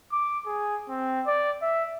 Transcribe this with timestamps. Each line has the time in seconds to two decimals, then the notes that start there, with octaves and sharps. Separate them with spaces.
0.13 D6
0.47 G#4
0.89 C4
1.27 D5
1.62 E5